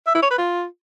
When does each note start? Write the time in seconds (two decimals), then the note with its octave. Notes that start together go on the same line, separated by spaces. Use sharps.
0.07 E5
0.15 E4
0.22 C#5
0.30 B4
0.38 F4